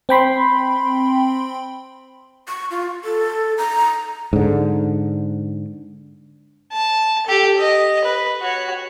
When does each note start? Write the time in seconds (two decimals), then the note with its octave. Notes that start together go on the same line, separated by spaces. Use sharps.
0.09 C4 G5 B5 C6
2.49 C#6
2.71 F4
3.05 A4
3.58 A#5
4.33 G#2 D3
6.72 A5
7.26 G4 A4
7.57 D#5
8.04 B4
8.41 F#4 C#5